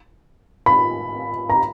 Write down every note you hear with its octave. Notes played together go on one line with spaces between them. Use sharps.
B5
A#5